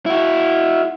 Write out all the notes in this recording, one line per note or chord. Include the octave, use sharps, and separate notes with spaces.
E4 F#4